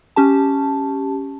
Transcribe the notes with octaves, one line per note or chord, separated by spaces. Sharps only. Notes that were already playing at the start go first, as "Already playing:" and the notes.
C#4 G4 A5